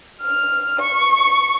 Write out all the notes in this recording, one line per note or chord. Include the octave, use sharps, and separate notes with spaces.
F6
C#6